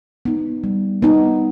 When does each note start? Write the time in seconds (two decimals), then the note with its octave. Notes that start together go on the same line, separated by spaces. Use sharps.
0.25 B3 D#4
0.64 G3
1.02 B3 D#4